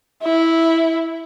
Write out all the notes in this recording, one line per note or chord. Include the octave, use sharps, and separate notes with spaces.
E4